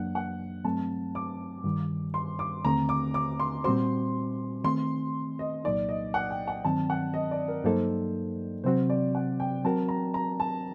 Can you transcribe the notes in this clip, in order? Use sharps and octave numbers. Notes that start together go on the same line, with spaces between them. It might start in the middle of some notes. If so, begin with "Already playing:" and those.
Already playing: F#2 F#3 A#3 D4 F#5
F#5
G2 F#3 A3 C4 A5
D6
G2 D#3 G3
C6
D6
D#2 D3 A3 C4 A#5
D6
D6
C6
A#2 G3 C4 F#4 C5 C6
D#3 A3 C4 C6
D#5
C2 A#2 F#3 A#3 D#4 D5
D#5
F#5
G5
F#5
G2 D#3 F#3 C4 A5
F#5
D#5
D5
A#4
G2 F#3 A#3 D#4 A4 C5
C3 F#3 C4 F#4 C5
D5
F#5
G5
F#3 C4 F#4 A#4 A5
A#5
A#5
A5